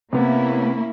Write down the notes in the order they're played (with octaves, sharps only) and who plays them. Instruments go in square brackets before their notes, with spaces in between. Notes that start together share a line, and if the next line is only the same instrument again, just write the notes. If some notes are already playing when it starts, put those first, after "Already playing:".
[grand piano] C3 B3 [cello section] A#3 C#4 E4